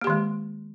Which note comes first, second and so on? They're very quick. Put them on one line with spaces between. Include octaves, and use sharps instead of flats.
A#3 G4 D#3 G#3